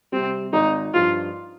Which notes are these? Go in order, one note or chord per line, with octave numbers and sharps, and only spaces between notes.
C3 G3 C4
G#1 D#4
G2 F3 F4